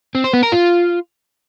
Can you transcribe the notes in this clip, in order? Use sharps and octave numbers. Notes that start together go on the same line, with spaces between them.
C4
C5
B3
A#4
F4